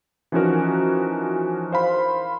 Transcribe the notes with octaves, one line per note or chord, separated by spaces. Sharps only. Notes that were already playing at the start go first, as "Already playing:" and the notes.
E3 F3 C#4 D#4 F#4 A#4
C5 F5 B5 C6